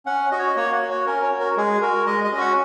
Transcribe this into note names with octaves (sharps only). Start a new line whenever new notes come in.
C#4 F#5
F#4 D#5
C#5
D#5
A#3 C#5
F#5
F#4
C#5
C#4 A#4
C#5
F#4
A#4
G#3 G#4
F#4 A#4
G#3 D#5
D#5
C#4
F#4 F#5